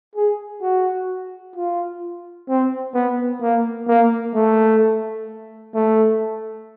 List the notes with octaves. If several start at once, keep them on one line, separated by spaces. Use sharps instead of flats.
G#4
F#4
F4
C4
B3
A#3
A#3
A3
A3